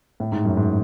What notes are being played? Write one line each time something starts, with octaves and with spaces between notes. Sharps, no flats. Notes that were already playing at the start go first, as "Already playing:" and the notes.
A2
G#2
F#2
G#2